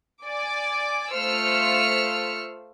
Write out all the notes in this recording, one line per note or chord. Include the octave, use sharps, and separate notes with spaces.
D5 G#5 D6
A3 F4 C5 E6 F6 C#7